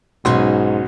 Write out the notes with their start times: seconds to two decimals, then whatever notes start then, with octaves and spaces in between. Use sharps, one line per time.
0.25 B1 G#2 C#4 F#4 D#5 C6